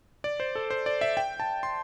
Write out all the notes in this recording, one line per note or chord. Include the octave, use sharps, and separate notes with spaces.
D5
C5
A4
C5
D5
E5
G5
A5
C6